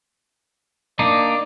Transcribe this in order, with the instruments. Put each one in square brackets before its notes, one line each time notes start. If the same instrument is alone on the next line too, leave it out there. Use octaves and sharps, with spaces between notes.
[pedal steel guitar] A#3 D4 D#4 [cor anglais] D5